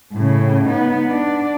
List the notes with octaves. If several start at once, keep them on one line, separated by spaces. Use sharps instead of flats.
A2 C#3
B3 D#4
D4 D5